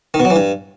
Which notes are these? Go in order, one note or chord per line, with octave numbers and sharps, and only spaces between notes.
D#3
B2
F#3
E3
G2